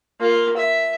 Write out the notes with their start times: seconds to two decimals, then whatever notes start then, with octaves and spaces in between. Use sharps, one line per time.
0.20 A#3 F4
0.57 E5